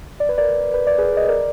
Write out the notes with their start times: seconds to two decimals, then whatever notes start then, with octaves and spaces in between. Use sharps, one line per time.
0.20 D5
0.29 B4
0.38 A#4 D5
0.74 B4
0.87 D5
0.98 G#4 B4
1.17 D#5
1.29 A#4 D5